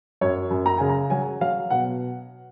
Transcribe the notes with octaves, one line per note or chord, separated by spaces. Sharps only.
F#2 C#5
F#2
A#5
C#3 G#5
A#5
F#3 G#5
F#3 F5
B2 F#5